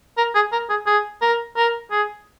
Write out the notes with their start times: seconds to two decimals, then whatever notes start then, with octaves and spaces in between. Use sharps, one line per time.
0.17 A#4
0.35 G#4
0.52 A#4
0.70 G#4
0.87 G#4
1.22 A#4
1.57 A#4
1.91 G#4